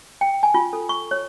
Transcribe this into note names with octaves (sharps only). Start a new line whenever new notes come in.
G5
G#5
F4
A4
C#6
C#5